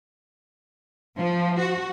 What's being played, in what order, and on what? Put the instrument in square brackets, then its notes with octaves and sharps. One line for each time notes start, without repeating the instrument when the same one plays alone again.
[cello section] F3
F#4